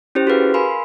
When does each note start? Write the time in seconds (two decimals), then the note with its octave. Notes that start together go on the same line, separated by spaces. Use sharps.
0.15 C#4 E4 G4 C5
0.27 F#4 G#4 B4 F5
0.54 A#4 F5 G#5 B5 C6